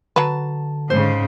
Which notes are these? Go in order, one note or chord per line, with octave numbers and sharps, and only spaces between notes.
D3 F#3 B4 A5
G#2 C#3 C5